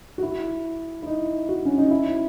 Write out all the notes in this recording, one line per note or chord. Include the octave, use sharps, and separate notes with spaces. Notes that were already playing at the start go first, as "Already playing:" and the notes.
F#4
E4
E4
D#4
F#4
C#4
D#4
E4